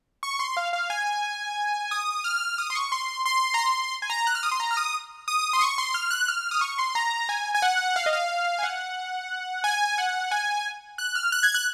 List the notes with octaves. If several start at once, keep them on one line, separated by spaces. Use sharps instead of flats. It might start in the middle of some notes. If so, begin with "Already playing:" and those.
C#6
C6
F5
F5
G#5
D#6
F6
D#6
C6
C#6
C6
C6
A#5
C6
G#5
A#5
F#6
F6
D#6
C6
A#5
F6
D#6
D#6
C6
C#6
C6
F6
F#6
F6
D#6
C#6
C6
A#5
G#5
G#5
F#5
F5
D#5
F5
G#5
F#5
G#5
F#5
G#5
F#6
F6
F#6
G#6
F#6